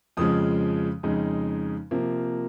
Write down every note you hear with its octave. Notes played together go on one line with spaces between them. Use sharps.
F2 C#3 F3 G#3 D#6
F2 C#3 G#3 D#4
C3 F3 A#3